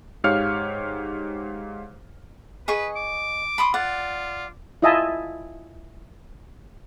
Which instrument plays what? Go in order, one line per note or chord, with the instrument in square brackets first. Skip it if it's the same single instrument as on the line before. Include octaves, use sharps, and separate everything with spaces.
[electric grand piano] G#2 G4 C#5 F5 F6 C#7
[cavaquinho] G#4 D#5 C#6 [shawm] B4
[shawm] D6
[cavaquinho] B5 C6 D#6
[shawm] F4 [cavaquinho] D5 F#5
[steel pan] E4 F4 D#5 E5 G#5 A5